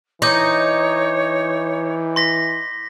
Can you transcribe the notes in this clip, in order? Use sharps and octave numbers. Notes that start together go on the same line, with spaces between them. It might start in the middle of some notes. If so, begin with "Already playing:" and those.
E3 D#4 C#5 C6 D6 G6
C6 A#6 B6